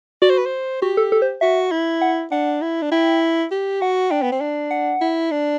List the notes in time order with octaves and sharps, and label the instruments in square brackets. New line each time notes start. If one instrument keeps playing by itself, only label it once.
[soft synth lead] F#4 [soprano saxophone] D5
[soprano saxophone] C5
B4
C5
[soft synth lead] F#4 [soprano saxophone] G4
[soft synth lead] A4
A4
C5
[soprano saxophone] F#4 [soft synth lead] E5
[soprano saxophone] E4
[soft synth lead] F#5
[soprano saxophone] D4 [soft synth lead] F#5
[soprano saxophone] E4
D4
[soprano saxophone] E4 [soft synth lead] G5
[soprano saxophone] G4
[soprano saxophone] F#4 [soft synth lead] F#5
[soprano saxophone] D4 [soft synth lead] G5
[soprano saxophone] B3
C4
D4
[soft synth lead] F#5
[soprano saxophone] E4
D4